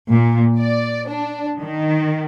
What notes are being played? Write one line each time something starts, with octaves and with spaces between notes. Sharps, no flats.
A#2
D5
D4
D#3